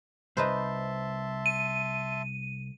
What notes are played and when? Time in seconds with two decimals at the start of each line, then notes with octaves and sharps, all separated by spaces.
0.37 C2 D#4 B4 C5 E5 A5 C6
1.46 D#7